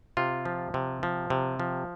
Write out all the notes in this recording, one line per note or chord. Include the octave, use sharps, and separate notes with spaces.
C3 F4
F3
C3
F3
C3
F3